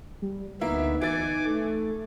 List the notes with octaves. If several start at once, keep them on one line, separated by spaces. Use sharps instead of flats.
G3
D2 A#3 B3 D#4 E4 E5
E3 G#5 D6 A6
A3